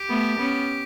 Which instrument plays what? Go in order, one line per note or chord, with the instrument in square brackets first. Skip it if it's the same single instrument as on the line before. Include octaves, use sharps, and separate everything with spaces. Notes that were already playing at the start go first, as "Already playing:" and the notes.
Already playing: [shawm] G4
[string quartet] A3 B3
B3 C#4